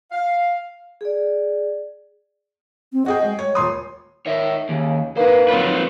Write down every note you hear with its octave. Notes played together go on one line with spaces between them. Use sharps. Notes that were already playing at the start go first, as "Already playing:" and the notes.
F5
G#4 D5
C4
F#4 G#4 D#5 G5
G#3
G#3 C#5
D#1 C#5 C6 D#6
D#3 C#5 E5
D#2 C#3
A#3 D#4 B4 C5
F#3 C4 F4 B4